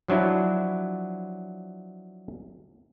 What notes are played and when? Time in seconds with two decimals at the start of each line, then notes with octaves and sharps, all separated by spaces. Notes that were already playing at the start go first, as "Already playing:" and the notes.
0.08 F3 F#3 D4 E4 F#4